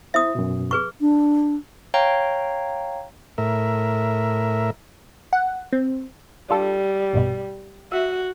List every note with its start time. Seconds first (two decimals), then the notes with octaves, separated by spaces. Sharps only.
0.14 E4 C5 E5 D#6
0.35 F#2 B2
0.71 G#4 B4 C#6
1.01 D4
1.94 C#5 F5 G5 A#5
3.38 A2 A#4 E5
5.33 F#5
5.73 C4
6.50 G3 D4 F4 A4
7.13 A#1 G2 B2
7.92 F#4 E5